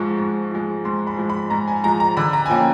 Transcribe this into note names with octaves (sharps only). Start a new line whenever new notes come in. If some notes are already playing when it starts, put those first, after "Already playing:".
Already playing: G#2 F3 G#3 C#6
G#2
F3 G#3
G#2 C6
B5
F3 G#3
B5
G#2 A#5
G#5
F3 G#3 A#5
A#5
D3 B5
A#5
G#5
F3 A#3 C#4 G5